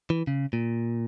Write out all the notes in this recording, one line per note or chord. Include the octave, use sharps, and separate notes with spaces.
E3
C#3
A#2